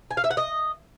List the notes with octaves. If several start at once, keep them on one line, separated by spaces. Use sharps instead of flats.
G#5
F5
E5
F#5
D#5